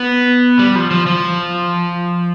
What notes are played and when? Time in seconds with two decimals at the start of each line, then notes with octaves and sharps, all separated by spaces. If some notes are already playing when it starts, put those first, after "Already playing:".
Already playing: B3
0.59 G3
0.75 F3
0.91 F3
1.07 F3